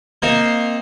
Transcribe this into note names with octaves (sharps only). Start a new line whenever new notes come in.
A#3 C4 D#4 F4 A#4 C5